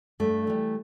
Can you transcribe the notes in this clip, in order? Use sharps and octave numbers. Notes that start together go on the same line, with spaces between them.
G2 A3
E3 G3